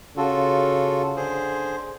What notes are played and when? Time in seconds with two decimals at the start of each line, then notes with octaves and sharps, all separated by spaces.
0.17 C#3 F4 F#4 A4
1.16 D3 G#4 C5